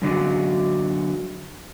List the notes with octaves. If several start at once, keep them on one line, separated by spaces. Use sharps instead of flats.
F#2 D3 F#3